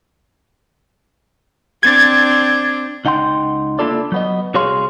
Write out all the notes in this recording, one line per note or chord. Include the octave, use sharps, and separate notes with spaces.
C4 D4 G#6 A6
C#2 D#4 F#5 G5 C6
A#3 D4 E4 F4 A4 D5
F#3 B3 D#5
C2 F#4 G#4 C#5 F5 C6